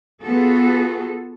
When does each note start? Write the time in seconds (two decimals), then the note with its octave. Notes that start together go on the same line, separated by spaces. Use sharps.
0.22 B3 F4 F#4 G#4 A4